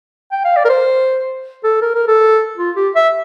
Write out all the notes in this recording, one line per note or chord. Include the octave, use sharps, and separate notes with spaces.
G5
F5
D5
A#4
C5
A4
A#4
A#4
A4
F4
G4
E5